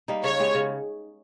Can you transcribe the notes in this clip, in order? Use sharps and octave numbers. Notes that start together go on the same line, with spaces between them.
G3 A#3 D#4
C#3 C#5
G#3 B3 G4
C#3